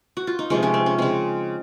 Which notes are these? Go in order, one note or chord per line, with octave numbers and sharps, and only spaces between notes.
F#4
F4
D#4
C3 F3 G#3 C#4
C#4
C4
C#4
C#3 G#3 C4